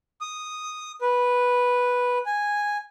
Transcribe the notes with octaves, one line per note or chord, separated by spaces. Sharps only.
D#6
B4
G#5